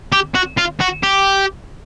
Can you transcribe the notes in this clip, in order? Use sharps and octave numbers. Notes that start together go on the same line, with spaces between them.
G4
F#4
F4
F#4
G4